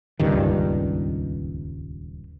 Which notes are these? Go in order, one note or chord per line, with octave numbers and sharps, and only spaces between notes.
D#1 C#2 G2 D#3